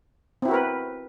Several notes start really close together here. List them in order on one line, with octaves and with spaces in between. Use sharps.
C4 E4 F#4 A#4 B4